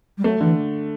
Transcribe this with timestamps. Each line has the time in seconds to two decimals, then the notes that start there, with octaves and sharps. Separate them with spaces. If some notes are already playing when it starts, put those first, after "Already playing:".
0.17 G3
0.24 F#3 A3
0.41 D3 E3